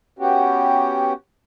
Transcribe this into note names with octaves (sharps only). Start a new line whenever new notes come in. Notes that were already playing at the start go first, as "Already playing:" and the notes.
B3 C#4 F#4 G4